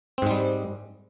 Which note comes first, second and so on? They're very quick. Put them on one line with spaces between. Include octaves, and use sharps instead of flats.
C4 G#2 G#3 G3